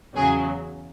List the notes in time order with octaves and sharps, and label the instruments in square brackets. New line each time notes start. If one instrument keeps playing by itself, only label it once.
[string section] E2 C#3 F#3 G#4